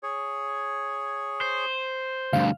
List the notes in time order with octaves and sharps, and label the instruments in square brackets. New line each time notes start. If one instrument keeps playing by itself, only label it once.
[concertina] G#4 C#5
[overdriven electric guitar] C5
[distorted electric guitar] D2 G2 [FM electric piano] F5